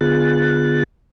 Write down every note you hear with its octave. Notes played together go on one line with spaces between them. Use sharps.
D3 B3 F4 G#4 F#6 A6